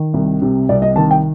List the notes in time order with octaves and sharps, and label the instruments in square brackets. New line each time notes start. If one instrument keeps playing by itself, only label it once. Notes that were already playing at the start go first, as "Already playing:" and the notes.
Already playing: [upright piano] D#3
C2
C3
C2 D5
D#5
D#3 A5
G5